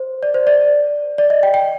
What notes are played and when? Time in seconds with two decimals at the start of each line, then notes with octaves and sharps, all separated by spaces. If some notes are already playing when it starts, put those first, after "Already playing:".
Already playing: C5
0.23 D5
0.34 C5
0.47 D5
1.18 D5
1.30 D#5
1.43 G5
1.54 G5